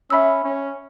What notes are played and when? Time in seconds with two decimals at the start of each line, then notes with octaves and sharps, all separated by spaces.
0.10 C#4 E5 B5 E6
0.44 C#4